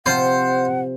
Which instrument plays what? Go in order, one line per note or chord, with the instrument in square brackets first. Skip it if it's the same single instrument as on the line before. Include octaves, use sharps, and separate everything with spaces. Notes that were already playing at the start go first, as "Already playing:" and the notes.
[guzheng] C3 F3 F4 [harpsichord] C5 [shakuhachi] F#5